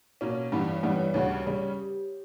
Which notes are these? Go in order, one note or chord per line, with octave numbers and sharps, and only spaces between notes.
B2 A#3 C#4
G2 E3 G3 B3
C#5
G2 E3 G3 B3 B4
C#5
D2 C#3 G3 C#4 F#4
C#3 G3 C#4 G4